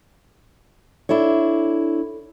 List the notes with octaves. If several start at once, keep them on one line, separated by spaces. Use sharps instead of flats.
D4 E4 A4 C#5